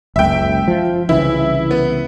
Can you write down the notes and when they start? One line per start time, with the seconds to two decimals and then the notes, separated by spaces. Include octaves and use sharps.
0.16 F#1 C#2 E5 G5
0.68 F3
1.09 C2 C#3 E3 E4
1.71 B3